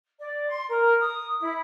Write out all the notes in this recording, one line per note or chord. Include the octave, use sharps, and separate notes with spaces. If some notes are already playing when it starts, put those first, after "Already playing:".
D5
C6
A#4
D#6
E4